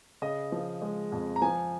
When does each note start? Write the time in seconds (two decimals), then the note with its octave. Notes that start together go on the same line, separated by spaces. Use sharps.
0.22 C#3 D#5
0.52 F3
0.82 G#3
1.12 F2
1.36 A#5
1.42 F3 G#5